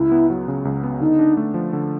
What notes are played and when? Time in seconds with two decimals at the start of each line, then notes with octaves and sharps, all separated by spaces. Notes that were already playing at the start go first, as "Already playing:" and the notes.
Already playing: C#2 E4
0.12 B3
0.30 F#3
0.48 C#3
0.65 C#2
0.83 B3
1.00 D3 D#4
1.19 D4
1.37 A3
1.54 F3
1.73 D3